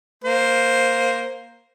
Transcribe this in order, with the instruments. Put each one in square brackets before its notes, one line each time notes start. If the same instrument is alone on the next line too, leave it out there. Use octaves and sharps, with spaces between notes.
[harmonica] A#3 C5